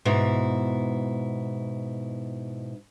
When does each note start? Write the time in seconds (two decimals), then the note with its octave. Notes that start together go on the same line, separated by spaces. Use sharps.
0.05 G#2 B2 E4